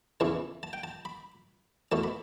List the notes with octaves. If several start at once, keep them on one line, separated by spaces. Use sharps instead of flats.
E2 C#3 E3 A5
A5
G5
A5
B5
E2 B2 A3 A5
B5